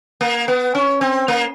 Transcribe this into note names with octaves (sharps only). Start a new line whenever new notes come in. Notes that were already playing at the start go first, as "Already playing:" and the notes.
A#3
B3
C#4
C4
A#3